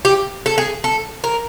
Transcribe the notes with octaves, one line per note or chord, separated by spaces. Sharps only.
G4
A4
G#4
A4
A#4